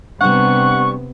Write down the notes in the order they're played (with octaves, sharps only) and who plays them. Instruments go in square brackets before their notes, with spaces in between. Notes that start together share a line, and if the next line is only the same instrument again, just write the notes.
[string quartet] C3 B3 [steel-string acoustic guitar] G3 D4 [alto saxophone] F#5 [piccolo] C#6